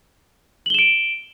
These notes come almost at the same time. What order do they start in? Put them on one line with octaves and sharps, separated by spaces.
F#7 G7 E7 D7